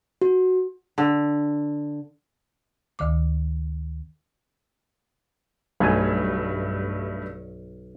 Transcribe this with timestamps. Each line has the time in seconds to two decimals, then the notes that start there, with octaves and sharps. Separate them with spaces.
0.21 F#4
0.98 D3
2.99 D2 D#3 D6
5.80 B1 G2 A3 G#5